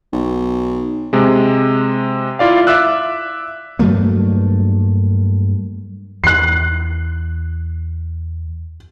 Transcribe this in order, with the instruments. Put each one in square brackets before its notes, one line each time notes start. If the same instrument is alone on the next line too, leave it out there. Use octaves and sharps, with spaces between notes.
[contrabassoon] B1
[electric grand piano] C3 G#3
E4 F4 D5 F5
E5 D6 E6 F#6
[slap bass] G2 F#3 A3 A#3
[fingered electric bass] E2 [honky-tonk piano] F#6 C7